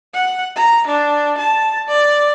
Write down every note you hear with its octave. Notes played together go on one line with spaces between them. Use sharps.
F#5
A#5
D4
A5
D5